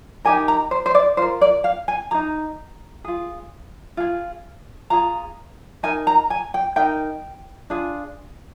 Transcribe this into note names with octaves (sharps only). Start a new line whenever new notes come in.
D#4 G4 A#4 G#5
A#5
C5
C5
D5
F4 A#4 C5
D5
F5
G#5
D#4 G#4 A#5
F4 G#4
F4 G#4
F4 G#4 A#5
D#4 A#4 G#5
A#5
G#5
G5
D#4 A#4 G5
D4 F4 G#4